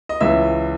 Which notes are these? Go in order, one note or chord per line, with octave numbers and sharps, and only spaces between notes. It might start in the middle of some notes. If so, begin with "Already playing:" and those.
D#5
C#2 C#3 E3 E5